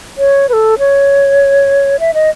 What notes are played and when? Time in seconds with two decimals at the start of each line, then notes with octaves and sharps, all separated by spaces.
0.18 C#5
0.49 B4
0.53 A4
0.79 C#5
2.00 E5
2.14 D#5